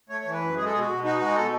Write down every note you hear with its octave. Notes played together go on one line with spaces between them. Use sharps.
A3 C#5
E3
B4
F#2
G#3 G#4
A4
B2 G#4
F#4
B2
D#4 F#4
G#3 F#4
B2 A4